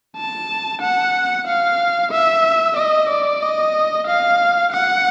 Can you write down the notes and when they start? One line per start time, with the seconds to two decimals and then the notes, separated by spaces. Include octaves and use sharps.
0.16 A5
0.81 F#5
1.47 F5
2.11 E5
2.76 D#5
3.09 D5
3.42 D#5
4.07 F5
4.72 F#5